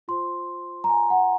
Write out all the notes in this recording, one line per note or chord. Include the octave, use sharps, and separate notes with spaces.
F4 C5 C6
A#5
G#5
F#5